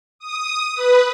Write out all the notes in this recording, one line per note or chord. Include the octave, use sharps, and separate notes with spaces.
D#6
B4